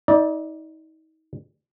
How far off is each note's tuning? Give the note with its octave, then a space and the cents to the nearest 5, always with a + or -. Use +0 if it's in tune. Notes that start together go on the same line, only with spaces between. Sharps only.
D#4 +35 D5 +0